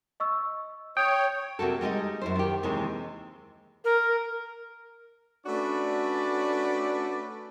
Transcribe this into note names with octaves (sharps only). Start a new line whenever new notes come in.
D#5 C#6 E6
C#5 G5 D#6
C3 A#3 F#4 A4
G3 G#3 D#4 D#5
F#2 E4 C5
D#3 G4
D#2 C3 D#3 E3 G#3
A#4
A3 C#4 D4 F#4 B4 D5